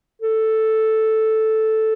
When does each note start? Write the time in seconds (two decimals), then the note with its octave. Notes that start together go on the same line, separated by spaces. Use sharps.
0.22 A4